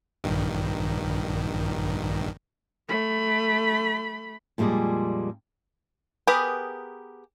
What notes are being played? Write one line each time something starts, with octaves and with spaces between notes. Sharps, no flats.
A#1 G2 D#3
A3 B5
F2 A#2 G3 G#3 G#4
B3 G4 G#4 A#4 B4